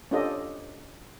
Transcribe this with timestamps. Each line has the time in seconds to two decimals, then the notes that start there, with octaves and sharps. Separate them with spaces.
0.11 C#4 D4 F4 G4 A4 D#5